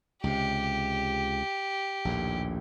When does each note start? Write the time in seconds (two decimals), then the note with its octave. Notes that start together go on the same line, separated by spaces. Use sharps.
0.24 C#2 C3 G4
2.05 A#1 D#2 A2